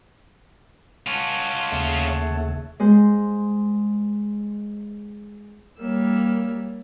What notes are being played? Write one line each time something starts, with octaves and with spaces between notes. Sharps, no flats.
C#4 F4 C#5 F#5 A5
D#2 C#3 A3
G#3 C5
G3 A#3 C#5 E6